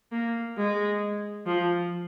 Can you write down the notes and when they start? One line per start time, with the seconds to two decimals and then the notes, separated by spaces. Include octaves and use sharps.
0.12 A#3
0.57 G#3
1.46 F3